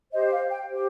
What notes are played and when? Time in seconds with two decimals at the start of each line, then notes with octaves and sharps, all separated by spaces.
0.12 G4 C5 D#5
0.32 F5
0.50 G5
0.69 G4 C5